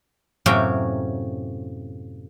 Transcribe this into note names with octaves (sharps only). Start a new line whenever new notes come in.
F#2 A2 C3 A#3 C#4 G5